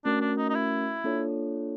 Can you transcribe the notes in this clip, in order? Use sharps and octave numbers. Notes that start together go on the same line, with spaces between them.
A3 C#4 D4 F#4 A#4
D4
D#4
D#4
E4
A#3 D4 F4 A4 C#5